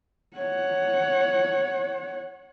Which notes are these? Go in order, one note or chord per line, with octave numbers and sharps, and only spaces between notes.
C#5 F#5